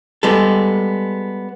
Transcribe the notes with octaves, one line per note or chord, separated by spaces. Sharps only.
G3 G#3 B3 A4